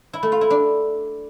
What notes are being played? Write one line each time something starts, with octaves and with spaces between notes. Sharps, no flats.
E4
A3
F4
E4
D4